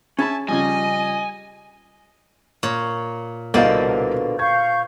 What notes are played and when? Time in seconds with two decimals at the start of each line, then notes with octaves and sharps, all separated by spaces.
0.19 C#4 G#4 E5 G#5 A5 B5
0.49 C#3 F3 G3 D#5 G#5
2.63 A#2 C#5
3.54 C2 B2 D3 A#3 C5 D5 D#5 F5
4.39 F5 C#6 G6 G#6